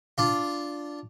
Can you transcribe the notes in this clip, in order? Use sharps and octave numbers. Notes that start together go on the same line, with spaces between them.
D4 F4